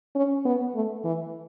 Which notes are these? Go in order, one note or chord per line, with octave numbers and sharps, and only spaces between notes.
C#4
B3
A3
E3